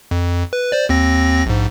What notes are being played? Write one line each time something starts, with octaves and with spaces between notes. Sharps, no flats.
F2
B4
C5 D5
D#2 C4 A#6
A#1 G#2